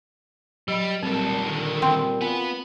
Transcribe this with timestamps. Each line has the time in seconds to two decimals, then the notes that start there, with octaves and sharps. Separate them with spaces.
0.68 F#3 G3 D#5 B5
1.03 C2 A#2 F#3 G3 C4 A4 A#4
1.45 D3 D#3
1.82 C4
2.21 B3 F4 B4 G#5